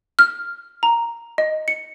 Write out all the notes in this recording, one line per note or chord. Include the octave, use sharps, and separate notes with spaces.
F6
A#5
D#5
C#7